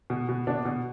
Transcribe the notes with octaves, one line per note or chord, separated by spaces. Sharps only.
B2
B2
B2 D4
B2